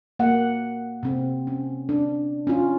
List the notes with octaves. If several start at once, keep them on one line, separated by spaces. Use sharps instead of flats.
A#3 F#5
C3 C4
C#4
D4
C#4 F4